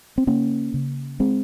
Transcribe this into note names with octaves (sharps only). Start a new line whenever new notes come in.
C4
C#3 A#3 C#4
C#3
G#3 C4